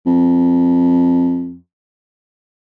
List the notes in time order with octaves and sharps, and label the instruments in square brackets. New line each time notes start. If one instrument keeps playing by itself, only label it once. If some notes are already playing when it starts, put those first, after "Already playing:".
[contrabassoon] F2